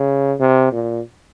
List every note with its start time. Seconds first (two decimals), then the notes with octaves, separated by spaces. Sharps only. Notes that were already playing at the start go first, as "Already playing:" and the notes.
Already playing: C#3
0.40 C3
0.72 A#2